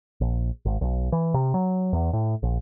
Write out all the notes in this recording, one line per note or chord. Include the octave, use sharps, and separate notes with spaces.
A#1
G#1
B1
E3
C3
F#3
E2
A2
A#1